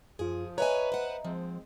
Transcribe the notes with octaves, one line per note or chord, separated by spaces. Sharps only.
F#2 F3 F4 G#4
B4 C#5 D#5 E5 G5 G#5 A#5
C5 F#5
F3 G#3 C4